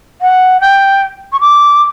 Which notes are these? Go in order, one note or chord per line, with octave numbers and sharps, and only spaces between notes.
F#5
G5
C#6
D6